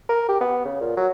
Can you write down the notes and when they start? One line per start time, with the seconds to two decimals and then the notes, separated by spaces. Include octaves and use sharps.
0.09 A#4
0.29 G4
0.41 B3
0.65 C#3
0.81 A#2
0.97 F#3